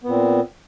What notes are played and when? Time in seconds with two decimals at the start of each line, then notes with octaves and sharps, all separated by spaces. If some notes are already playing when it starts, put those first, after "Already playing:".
0.04 B3
0.07 A#2
0.09 C4